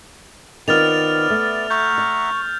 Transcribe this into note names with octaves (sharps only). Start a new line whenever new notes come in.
D#3 B3 C4 F4 D5 F6 A6 F7
A3
E5 F#5 A#5 C#6 G6
D5